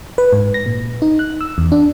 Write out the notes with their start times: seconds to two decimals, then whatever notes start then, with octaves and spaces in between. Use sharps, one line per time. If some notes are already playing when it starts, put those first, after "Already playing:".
0.18 B4
0.33 G#2
0.54 A#6
0.66 A#2
1.02 D#4
1.19 F#6
1.41 E6
1.58 E2
1.72 D4